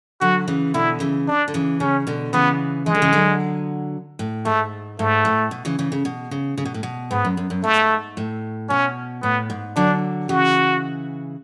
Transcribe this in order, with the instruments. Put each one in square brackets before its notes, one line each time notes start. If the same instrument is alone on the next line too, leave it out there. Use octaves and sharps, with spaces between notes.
[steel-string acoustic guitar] D3 F#3 [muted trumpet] F#4
[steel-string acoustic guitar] C#3 E3
[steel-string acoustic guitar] B2 D3 [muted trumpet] E4
[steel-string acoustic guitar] C#3 E3
[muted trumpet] D4
[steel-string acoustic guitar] D3
C#3 E3
[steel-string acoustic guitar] C#3 [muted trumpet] C#4
[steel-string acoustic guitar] B2 D3
[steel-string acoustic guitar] C#3 E3 [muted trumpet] B3
[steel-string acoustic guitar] E3 [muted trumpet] G#3
[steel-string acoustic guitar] D3
C#3 E3
D3 F#3
A2
[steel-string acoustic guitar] G#2 [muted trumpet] A3
[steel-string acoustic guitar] G#2 [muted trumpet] A3
[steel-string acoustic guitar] A2
B2
C#3 E3
C#3 E3
C#3
B2
C#3
C#3
B2
A2
B2
[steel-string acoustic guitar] G#2 [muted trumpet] B3
[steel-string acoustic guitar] F#2
F#2
F#2
[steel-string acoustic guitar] G#2 [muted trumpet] A3
[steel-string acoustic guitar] A2
[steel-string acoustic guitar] B2 [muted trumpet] C#4
[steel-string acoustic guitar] A2 [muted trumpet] B3
[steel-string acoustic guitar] G#2
[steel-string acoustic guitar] D3 F#3 [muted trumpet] D4
[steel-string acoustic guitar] C#3 E3 [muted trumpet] F#4